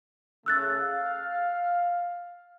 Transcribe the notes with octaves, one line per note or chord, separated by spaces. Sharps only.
C#3 A3 E6 F#6 A6
F5